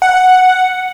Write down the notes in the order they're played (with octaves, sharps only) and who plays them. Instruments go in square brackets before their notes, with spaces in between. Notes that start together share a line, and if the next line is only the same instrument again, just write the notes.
[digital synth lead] F#5